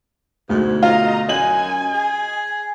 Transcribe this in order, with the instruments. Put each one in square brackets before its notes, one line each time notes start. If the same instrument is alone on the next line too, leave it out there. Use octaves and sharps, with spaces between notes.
[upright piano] D2 B2 A3 [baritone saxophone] G#2
[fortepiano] F4 [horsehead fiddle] D#5 A#5
[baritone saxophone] F#2 [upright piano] D#5 F#7 [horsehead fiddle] G#5
[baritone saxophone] G#4